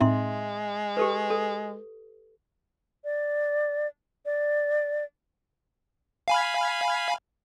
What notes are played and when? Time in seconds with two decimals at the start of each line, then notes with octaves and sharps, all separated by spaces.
0.01 A2 G#3 C4 D#4 E5 C6
0.97 G4 A4 B4
1.30 A4
3.04 D5
4.26 D5
6.28 F5 G#5 B5